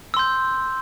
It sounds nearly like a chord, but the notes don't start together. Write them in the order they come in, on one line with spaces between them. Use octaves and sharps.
E6 C6 G6